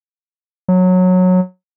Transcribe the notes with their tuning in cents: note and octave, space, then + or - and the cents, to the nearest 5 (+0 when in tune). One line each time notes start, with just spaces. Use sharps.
F#3 -15